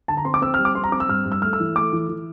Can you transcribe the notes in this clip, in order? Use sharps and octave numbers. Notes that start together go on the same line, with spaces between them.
D3 A5
A#5
C4 C6
D6
C4 E6
F6
G3
D6
C4 C6
A#5
C4 D6
E6
G2 F6
G2
E6
A3 F6
E6
E3
A3 D6
E3
E3